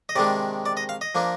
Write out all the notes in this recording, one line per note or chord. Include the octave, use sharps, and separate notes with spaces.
D#5
C3 D#3 G#3 D4 D5
D5
D#5
F5
D#5
F3 A#3 D4